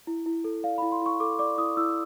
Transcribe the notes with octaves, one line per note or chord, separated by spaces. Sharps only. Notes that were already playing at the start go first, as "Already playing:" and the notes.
E4
E4
A4
D5 F5
E4 B5
C6
E4 C#6
A4 D6
D5 D6
E4 D#6
E4 E6